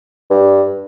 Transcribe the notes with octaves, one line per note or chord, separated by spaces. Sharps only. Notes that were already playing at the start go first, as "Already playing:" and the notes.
G2